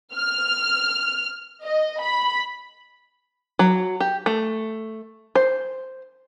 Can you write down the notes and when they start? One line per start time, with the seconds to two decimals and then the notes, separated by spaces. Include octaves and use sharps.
0.14 F6
1.63 D#5
2.01 B5
3.59 F#3
4.00 G4
4.26 A3
5.35 C5